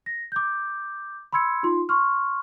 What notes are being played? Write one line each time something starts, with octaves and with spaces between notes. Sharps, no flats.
A#6
D6 G6
B5 C6 E6 G#6 C#7
D#4 F4 C6
C6 C#6 F6